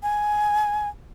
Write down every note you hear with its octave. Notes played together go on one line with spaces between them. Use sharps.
G#5